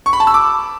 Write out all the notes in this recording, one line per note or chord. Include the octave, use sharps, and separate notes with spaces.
C#6
B5
A5
E6
D6